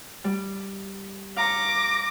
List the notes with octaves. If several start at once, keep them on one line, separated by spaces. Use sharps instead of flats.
G3
F5 A#5 C#6 D6 A#6